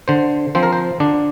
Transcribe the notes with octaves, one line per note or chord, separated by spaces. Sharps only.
D3 C5
F3 C4 C5
A#4
C5
D3 D4